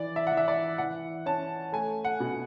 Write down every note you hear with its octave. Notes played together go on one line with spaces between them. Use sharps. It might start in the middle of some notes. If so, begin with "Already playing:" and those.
Already playing: E3 D5
E5
E3 F#5
E5
D5
E3 F#5
C#4 A5
A3 G#5
F#5
B2